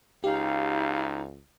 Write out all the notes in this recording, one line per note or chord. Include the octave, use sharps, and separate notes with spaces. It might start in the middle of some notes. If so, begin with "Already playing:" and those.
C#2 D#4 G4 F5